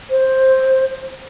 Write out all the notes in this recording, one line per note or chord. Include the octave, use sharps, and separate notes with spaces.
C5